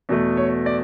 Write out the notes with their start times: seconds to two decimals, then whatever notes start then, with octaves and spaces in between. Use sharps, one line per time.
0.09 E2 B2 A3
0.37 C#5
0.66 D5